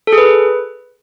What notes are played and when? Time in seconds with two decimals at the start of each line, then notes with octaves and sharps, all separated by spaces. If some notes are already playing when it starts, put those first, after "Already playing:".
0.07 A4
0.12 G#4
0.18 B4